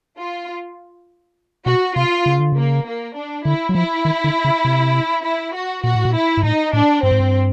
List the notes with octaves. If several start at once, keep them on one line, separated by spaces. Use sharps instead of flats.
F4
B2 F#4
C3 F4
C#3
D3
C#3 A#3
A#3
D4
D3 E4
F#3
F3 E4
D#3
D3
C#3
C3
E4
F#4
A#2 F#4
A2
A#2
E4
G#2
A2 D#4
A2 D4
G2 C4
G#2
G2